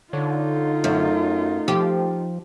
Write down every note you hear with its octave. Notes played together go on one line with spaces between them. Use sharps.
D3 D#4 F4 C#5
F#2 A3 A4
F3 G4